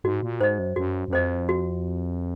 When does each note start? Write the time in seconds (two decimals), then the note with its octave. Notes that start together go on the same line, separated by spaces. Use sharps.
0.04 G#2 F#4
0.23 A#2
0.40 G#2 C5 D#5
0.59 F#2
0.76 F#2 F#4
1.08 F#2
1.13 F2 C5 D#5
1.49 F#4